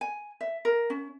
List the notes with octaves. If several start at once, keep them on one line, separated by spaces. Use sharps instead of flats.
G#5
E5
A#4
C#4